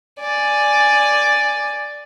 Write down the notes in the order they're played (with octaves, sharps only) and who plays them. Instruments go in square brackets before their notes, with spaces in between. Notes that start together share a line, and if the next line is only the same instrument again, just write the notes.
[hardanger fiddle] D5 G#5